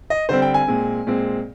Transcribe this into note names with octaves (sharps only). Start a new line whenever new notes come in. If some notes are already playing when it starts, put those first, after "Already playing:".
D#5
D3 G3 C4 C5
G5
G#5
A#2 G#3 C4
A#2 G#3 C4